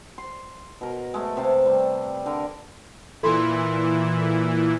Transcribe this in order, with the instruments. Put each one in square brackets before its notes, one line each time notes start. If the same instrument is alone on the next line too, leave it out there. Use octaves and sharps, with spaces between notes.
[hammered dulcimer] C6
B2 A#4
G#3 A3
C3 F5 A5
G3
D3 A#4
[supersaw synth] A#2 E3 E4 [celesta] A4 C6